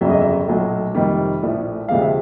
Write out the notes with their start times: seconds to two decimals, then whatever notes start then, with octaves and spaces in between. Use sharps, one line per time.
0.01 G1 F2 C#3 F#3 E5
0.10 D#5
0.20 E5
0.48 B1 A#2 F#3 A3
0.95 F2 C3 D#3 G3
1.43 A#1 A2 F3 A3
1.88 D2 C3 F3 G#3 F5
2.01 E5